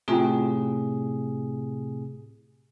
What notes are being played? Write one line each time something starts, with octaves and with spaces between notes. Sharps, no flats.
A2 C3 C#4 F4 G#4 A#5